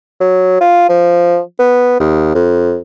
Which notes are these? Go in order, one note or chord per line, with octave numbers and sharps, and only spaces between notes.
F#3
F4
F3
B3
D#2
F2